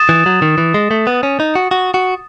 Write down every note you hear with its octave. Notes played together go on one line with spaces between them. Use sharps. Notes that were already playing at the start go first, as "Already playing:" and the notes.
Already playing: D#6 A6 E7
E3
F#3
D#3
E3
G#3
A3
B3
C#4
D#4
F#4
F#4
F#4